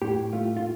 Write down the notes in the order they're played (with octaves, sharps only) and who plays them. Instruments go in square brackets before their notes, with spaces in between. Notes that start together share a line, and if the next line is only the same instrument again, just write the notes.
[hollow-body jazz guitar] A2 G4
A3 F4
F4